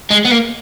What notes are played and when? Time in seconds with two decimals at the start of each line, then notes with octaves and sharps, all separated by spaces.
0.11 G#3
0.25 B3
0.31 A#3